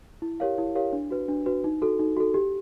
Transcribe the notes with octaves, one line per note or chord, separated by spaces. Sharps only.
E4
G4 A#4 C#5 F5
E4
G4 A#4 C#5 F5
D4
F#4 B4
D4
F#4 B4
D#4
F#4 A4
D#4
F#4 A4
G4